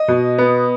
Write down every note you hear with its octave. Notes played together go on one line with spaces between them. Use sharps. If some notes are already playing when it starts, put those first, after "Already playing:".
Already playing: D#5
B2
B3